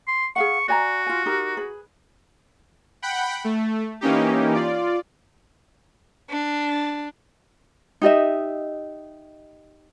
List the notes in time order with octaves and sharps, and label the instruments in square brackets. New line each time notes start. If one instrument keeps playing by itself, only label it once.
[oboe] C6
[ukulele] G#4 F5 F#5 [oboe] C#6
[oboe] F#4 [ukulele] D5 G#5 A#5
[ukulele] F4 G#5
D#4 G4 A#4
G#4 B4
[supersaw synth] F#5 G5 B5
A3
E3 A#3 C#4 D#4 G4
F4 D5
[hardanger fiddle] D4
[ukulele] D#4 G4 D#5 E5